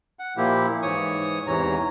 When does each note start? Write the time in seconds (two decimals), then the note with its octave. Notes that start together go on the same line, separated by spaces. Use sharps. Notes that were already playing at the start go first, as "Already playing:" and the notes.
0.19 F#5
0.37 A#2 F3 A#3 E4 G4
0.82 G#2 E3 C#5 C#6 D#6
1.47 E2 G#2 C3 E3 C#5 A#5